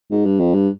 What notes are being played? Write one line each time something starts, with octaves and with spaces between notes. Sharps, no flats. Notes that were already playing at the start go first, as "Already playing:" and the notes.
G#2
G2
F2
G2